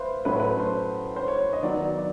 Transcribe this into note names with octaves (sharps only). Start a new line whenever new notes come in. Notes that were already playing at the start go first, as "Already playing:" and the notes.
Already playing: B4 C5 E5 F5
A2 F#3 A3 C#4 B4
C5
B4
C5
C5
C#5
D#5
D#3 F#3 B3 D5
D5